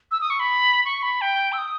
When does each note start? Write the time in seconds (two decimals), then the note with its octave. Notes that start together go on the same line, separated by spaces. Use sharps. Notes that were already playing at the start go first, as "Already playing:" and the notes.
0.11 E6
0.21 D#6
0.30 C#6
0.40 B5
0.85 C#6
1.03 B5
1.21 G5
1.53 E6
1.58 D#6